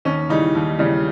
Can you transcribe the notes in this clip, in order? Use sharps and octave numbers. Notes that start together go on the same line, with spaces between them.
D#2 C#4
C#3 E3 G3 D#4
D#2
C#3 E3 G3